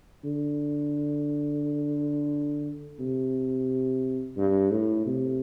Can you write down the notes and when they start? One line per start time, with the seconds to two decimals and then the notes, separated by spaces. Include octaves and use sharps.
0.25 D3
2.99 C3
4.37 G2
4.71 A2
5.06 C3